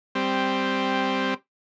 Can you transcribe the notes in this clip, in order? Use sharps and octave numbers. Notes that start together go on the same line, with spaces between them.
G3 C4